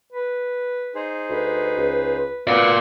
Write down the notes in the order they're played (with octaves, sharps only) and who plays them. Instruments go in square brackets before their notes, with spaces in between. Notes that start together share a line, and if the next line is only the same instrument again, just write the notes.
[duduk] B4
[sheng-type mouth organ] D#4 G#4 C5
[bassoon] D2 [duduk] B4
[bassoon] C#2
[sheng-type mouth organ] B3 F#4 [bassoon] F4 [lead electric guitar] A#4 D5